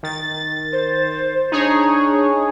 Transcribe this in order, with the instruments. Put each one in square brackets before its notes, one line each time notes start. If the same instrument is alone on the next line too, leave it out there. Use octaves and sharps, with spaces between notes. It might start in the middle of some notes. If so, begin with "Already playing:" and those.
[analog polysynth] D#3 A6
[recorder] C5
[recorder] D4 [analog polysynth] D#4 G#4 C#5